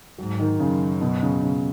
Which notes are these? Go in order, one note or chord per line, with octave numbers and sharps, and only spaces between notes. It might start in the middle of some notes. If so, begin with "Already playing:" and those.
G#2 F#3
D#3
F#2 C#3
B2
C#3
C#3